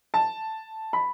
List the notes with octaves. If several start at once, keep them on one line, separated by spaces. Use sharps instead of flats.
A5
B5